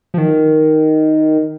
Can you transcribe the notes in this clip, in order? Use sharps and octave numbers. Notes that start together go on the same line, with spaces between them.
F3
D#3